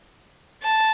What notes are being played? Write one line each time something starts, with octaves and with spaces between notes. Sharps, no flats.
A5